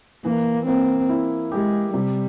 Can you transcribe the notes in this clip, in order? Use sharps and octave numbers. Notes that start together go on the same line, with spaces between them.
E3 A#3
A#3 C4
E4
G#3 G4
C3 G3